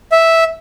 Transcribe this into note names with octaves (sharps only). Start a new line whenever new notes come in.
E5